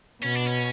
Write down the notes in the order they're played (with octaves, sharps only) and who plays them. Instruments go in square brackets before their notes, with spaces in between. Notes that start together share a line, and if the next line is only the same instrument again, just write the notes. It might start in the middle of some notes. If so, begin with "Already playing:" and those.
[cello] B2 [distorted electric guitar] C#4
[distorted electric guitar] D4
C#4